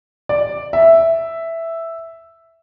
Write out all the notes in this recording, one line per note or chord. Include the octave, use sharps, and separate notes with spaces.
D5
E5